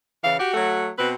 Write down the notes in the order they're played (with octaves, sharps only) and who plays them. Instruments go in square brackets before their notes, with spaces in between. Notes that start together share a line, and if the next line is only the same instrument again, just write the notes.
[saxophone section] C#3 E3 [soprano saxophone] F5
[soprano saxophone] F#4 [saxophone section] G4
[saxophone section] F#3 A3
[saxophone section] B2 C4 [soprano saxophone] B4